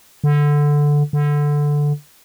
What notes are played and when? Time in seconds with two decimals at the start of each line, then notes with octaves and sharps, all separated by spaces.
0.24 D3
1.13 D3